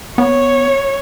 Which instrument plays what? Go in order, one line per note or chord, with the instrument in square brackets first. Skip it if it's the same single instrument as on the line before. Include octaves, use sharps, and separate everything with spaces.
[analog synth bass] B3 [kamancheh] C#5